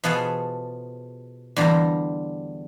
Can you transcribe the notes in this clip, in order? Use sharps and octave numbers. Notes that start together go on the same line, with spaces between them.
B2 F3 B3 F4 G#4 A4
E2 D3 G3 F4 C5 A#5